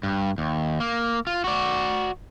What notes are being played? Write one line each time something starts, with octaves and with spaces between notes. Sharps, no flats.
G2
D#2
A#3
F4
F#4 D5